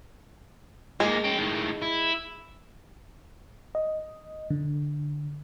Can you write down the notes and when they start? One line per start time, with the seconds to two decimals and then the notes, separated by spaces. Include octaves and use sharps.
1.00 G#2 G#3 A#3
1.24 C#4 G5
1.38 A2 D#3
1.82 E4
3.75 D#5
4.50 D3